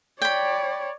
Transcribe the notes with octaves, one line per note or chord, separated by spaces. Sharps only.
C#5 D5 G5 B5